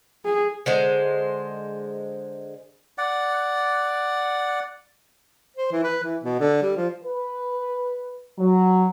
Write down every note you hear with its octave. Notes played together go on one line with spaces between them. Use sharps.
G#4
D3 G#3 C5
D5 F#5
C5
E3
B4
E3
B2
D3
G3
F3
B4
F#3